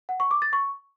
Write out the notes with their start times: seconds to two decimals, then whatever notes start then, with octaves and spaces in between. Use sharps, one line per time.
0.09 F#5
0.20 C#6
0.31 D6
0.42 A6
0.53 C#6